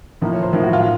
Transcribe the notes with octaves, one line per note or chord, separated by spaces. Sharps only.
A2 F3 A#3 D#4
C#5
C5
A2 F3 A#3 D#4 A#4
F#4
F4